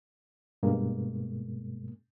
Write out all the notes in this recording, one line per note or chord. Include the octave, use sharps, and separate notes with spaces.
G2 B2 G#3 A#3